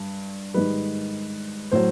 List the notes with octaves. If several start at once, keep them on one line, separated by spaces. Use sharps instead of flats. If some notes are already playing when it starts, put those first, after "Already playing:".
Already playing: G2
G#2 D#3 G3 B4
A2 F#3 C5